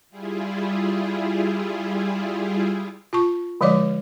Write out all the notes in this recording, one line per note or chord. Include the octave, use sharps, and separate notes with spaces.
G3 E4 F4 G#4
F4 A5 C#6
D3 F3 G#3 C#5 D5 D6